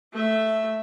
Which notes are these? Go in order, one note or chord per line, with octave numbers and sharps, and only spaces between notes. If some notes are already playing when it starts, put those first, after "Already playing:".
A3 E5